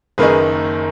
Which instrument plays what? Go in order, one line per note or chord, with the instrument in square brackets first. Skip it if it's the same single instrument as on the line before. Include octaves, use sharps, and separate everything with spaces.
[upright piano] F#1 F#2 D#3 A#3 D#4 G#4 B4